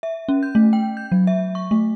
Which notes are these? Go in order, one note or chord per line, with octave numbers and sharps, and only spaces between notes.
E5
C#4
G6
A3
G5
G6
F#3
E5
C#6
A3